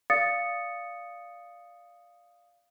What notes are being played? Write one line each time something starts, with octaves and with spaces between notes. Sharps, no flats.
D5 F5 D#6 A6 C#7